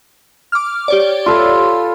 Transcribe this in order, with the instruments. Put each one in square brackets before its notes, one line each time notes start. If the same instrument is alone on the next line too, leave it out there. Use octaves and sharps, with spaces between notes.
[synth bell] D6 F6
G4 C#5 D5
[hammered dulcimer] F4 A4 B4